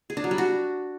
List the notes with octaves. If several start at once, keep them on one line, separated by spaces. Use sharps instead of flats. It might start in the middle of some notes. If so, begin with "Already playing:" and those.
G#4
D4
F#3
G3
F#4